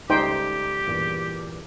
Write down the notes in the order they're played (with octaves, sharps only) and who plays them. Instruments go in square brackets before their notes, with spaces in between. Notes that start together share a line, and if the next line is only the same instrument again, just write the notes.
[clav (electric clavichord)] C#2 G3 A3 [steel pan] D#4 C5 G5 [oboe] G4
[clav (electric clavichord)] E2 G2 A#2